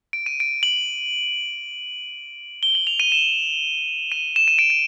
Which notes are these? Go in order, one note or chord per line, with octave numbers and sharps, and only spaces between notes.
D7
D#7
D7
F#7
G7
F#7
F7
D#7
E7
D#7
E7
D#7
D7
D#7